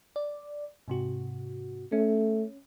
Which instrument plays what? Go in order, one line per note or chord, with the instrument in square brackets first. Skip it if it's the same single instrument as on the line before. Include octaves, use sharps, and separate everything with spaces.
[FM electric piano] D5
G#2 C3 F#4
[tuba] A3 [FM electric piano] C#4